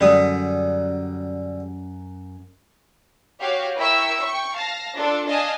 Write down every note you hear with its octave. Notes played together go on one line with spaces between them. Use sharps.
F#2 D3 G3 D#6
F#4 G4 C#5 F5
E4 A#4 E5 G5 C#6 E6
G5 C#6
F5 A5 A#6
D4 F4 A4
D4 D#5 F5 G#5 A5